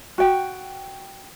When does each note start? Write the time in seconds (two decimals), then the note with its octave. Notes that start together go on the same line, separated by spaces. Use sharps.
0.18 F#4 G5